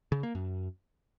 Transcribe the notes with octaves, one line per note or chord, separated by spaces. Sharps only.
C#3
A#3
F#2